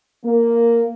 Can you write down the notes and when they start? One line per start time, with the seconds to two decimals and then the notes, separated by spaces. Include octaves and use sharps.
0.25 A#3